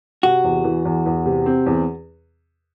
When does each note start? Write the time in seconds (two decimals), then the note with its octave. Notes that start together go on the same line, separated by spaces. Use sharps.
0.23 C3 F#4
0.44 E2
0.64 E3
0.85 E2
1.06 E2
1.26 C3
1.46 C4
1.66 E2